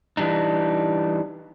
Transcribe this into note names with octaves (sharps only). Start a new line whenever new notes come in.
E3 G3 D4 D#4